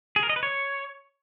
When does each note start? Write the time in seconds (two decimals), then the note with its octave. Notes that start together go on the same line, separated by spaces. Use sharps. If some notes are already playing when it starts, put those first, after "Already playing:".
0.16 G#4
0.23 A#4
0.29 D#5
0.36 B4
0.43 C#5